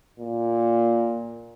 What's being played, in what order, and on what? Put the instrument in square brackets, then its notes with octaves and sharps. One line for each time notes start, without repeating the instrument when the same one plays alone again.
[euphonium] A#2